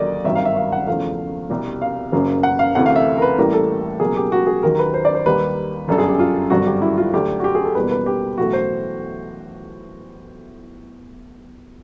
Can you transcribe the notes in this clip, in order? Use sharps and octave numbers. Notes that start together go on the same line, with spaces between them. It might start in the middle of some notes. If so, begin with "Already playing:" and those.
Already playing: D#2 D3 F#3 A#3 D5 D#5
G#1 G2 D#3 F#3 E5
F5
E5
F5
F#5
E2 C#3 F3 A3 F5
C2 B2 G3
F5
F#1 F#2 C#3 F#3 A#3
F#5
F5
D2 C3 E3 A3 F#5
F5
E5
A#4
B4
A1 A2 E3 G3 A#3 A#4
A4
C#2 B2 F#3 A#3 G#4
G4
F#4
G#4
D#2 D#3 F#3 A#4
B4
C5
D5
C5
D#2 D#3 G3 A#3 B4
G1 F#2 D3 A4
G#4
G4
F4
G#1 G2 D3 F#3 F#4
G4
E4
F4
D2 D3 F#3 G4
F#4
G4
G#4
A4
E2 B2 G3 A#3 B4
B4
G4
B1 A2 E3 A3 F#4
C5